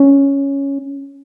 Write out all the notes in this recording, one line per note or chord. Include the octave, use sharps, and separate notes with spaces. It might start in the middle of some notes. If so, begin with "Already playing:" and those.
Already playing: C#4